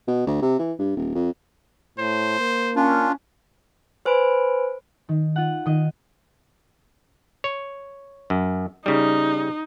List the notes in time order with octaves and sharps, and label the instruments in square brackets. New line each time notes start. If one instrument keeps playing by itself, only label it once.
[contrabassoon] B2
D2
C3
E3
G2
D#1
F2
[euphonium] A2 [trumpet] C5
[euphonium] A#3
[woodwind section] C#4 [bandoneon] D4 F4
[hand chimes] B4 C5 G#5 B5 D7
[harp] D#3
F4 F#5
D#3 D#5
[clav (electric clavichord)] C#5
F#2
[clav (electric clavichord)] C#3 G3 [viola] D#4